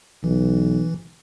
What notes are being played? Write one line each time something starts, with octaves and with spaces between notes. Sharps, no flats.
B1 E3